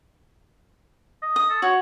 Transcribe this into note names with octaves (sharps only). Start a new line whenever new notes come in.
D#5
D#6
A4
F#4 C#5